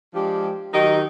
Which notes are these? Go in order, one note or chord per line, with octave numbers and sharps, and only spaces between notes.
F3 G#3 D4 G4
D#3 F#3 D#4 G4 D#5